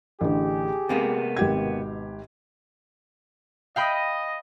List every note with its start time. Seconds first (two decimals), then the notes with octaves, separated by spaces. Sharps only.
0.21 A1 D3 G4 G#4
0.89 C3 G#3 A#3 B3
1.37 G#1 B2 G4 G#6
3.76 D#5 F5 G5 B5